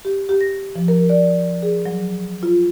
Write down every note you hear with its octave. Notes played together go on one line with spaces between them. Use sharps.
G4
G4
A#6
F3
A#4
D5
G#4
F#3
F4